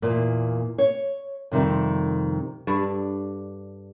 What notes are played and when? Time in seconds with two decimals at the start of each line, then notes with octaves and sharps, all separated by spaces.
0.02 E2 A#2 A#3
0.78 C#5
1.52 F2 C3 D#3 G3
2.67 G2 D4 A4 D5